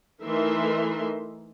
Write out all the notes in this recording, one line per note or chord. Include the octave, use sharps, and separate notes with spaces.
E3 A3 D#4 A#4 E5 C6